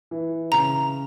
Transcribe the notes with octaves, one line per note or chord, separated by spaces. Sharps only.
E3
C#3 A#5